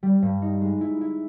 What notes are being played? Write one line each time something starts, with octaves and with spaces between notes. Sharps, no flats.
G3
G2
D#4
G#3
E4
E4